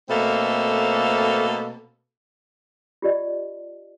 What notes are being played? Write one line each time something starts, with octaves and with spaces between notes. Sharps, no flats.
B2 A3 A#3 C4 A4
F4 G4 D5 D#5